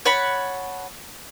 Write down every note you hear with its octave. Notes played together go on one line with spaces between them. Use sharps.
C#5 F#5 A5 B5